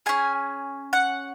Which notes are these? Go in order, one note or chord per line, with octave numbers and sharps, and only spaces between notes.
C#4 G#4 G#5
F#5